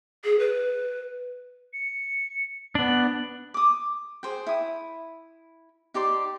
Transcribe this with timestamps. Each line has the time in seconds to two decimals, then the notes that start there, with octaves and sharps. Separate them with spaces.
0.24 G#4
0.40 B4
1.73 C#7
2.75 B3 D4 F#7
3.54 D6 D#6
4.23 G#4 C5 G5
4.47 E4 D#6
5.94 D#4 G4 D5 C6